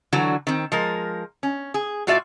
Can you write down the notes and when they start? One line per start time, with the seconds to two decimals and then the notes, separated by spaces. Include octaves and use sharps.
0.13 D3 E3 F#3 F#4
0.47 D#3 C4
0.72 F3 G#3 A#4
1.43 C#4
1.74 G#4
2.07 A2 F4 F#4 D5 E5